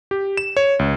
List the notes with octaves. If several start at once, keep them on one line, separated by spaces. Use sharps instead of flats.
G4
E7
C#5
C#2